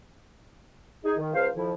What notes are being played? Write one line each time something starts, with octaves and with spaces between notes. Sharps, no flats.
D#4 G#4
D#3
C#2 C5 F5
F2 D#3 F3 E4